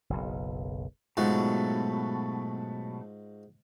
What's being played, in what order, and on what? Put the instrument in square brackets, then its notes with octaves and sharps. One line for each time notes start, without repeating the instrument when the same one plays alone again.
[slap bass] F#1 B1
[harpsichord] G#2 F4 F#4 [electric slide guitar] B2 F#3 A3